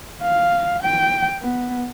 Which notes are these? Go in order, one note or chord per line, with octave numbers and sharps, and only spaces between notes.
F5
G5
B3